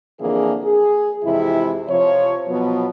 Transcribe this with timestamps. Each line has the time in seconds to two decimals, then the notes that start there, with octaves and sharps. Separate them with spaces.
0.20 F2 D3 E3 A#3 G#4
0.63 G#4
1.24 F2 C3 E3 G#3 E4
1.88 C3 F3 C#5
2.48 B2 F3 F#3 B3